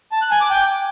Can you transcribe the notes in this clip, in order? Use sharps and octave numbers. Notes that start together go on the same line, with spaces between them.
A5
F#6
G#5
D6
G5